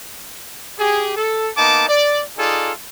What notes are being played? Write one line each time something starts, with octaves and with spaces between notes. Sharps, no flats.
G4 G#4
A4
A#3 B3 D#4 A5 D6
D5
D#4 F4 G#4 A4 D5